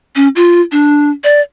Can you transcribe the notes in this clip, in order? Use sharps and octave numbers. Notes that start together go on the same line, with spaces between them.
C#4
F4
D4
D5